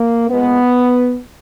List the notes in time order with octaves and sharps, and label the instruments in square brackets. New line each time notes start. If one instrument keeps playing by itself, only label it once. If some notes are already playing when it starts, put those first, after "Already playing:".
Already playing: [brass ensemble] A#3
A#2 G#3 B3